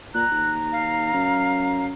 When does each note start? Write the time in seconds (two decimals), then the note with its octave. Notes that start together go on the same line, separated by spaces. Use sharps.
0.14 A#2 A#5 F#6
0.31 D#2
0.72 F5
1.14 F#2